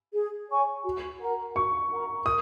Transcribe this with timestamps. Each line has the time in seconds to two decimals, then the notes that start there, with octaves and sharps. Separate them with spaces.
0.14 G#4
0.50 C#5 G#5 C#6
0.84 F#4
1.20 A#4 F#5 A#5
1.56 F#4 C#6
1.91 A#4 F#5 A#5
2.26 A#4 D#6